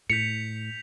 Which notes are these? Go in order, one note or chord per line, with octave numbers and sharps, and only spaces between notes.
A2 G6 B6 C#7 F7